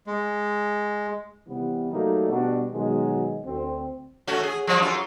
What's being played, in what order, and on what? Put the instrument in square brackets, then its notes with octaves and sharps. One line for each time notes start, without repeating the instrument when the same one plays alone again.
[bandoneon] G#3
[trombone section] C3 E3 G3 B3
F#3 G3 A3 A#3 D#4
B2 G3 D4 F#4
B2 D#3 F#3 G#3
D2 C4
[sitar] A3 C#4 F#4
G#4
F3 G3 C4
F#2 F4